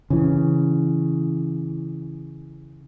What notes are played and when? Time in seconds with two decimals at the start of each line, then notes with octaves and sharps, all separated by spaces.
0.10 C#3 E3